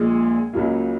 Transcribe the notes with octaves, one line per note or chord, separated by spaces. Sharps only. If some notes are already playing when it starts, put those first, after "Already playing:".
Already playing: A#1 A#2 G#3 G#4
C#2 C#3 F#3 A#3